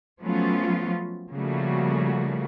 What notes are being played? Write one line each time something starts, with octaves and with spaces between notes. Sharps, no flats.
F3 F#3 A3 B3 C#4 F4
C#3 F3 G3 A3 A#3 F#4